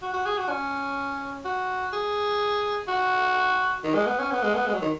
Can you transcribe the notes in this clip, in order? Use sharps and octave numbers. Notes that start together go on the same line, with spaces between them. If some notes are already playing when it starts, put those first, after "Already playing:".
F#4
F#4
G#4
F#4
C#4
F#4
G#4
F#4
D#3
G#3
B3
C#4
B3
G#3
B3
G#3
F#3
D#3